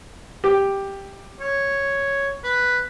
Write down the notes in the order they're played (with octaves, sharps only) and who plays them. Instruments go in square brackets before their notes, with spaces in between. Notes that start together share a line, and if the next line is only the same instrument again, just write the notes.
[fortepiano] G4
[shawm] C#5
B4